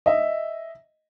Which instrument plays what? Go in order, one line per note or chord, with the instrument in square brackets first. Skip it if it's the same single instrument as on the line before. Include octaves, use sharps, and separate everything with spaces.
[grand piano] D#5 E5